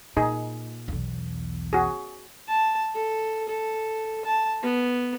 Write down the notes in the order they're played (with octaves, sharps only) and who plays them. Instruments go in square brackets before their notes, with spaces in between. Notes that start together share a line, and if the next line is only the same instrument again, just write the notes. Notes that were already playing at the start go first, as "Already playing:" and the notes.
[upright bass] A#2 [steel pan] D#4 G#4
[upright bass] B1 E2
[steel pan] F#4 G#4
[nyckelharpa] A5
A4
A4
A5
B3